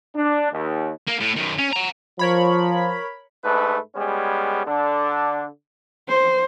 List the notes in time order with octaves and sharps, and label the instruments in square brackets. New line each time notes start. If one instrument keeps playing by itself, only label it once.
[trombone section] D4
D#2
[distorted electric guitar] A#3
A2
F#2 D#3
C#4
F#5 A#5
[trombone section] F3 [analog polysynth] A#4 C#5 B5
[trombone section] G#2 A3 D4 B4
G3 G#3 B3 C#4 G#4
D3 D4
[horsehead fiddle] C5